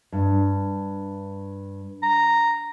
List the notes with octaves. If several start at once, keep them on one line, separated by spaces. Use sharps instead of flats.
G2
A#5